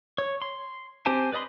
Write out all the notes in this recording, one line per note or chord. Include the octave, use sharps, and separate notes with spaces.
C#5
C6
C4 G4 C5 G#5 A5
B4 D5 D#5 B5 C6